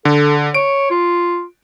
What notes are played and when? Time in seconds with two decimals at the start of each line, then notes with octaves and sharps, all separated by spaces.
0.05 D3 A4
0.54 C#5 D7
0.91 F4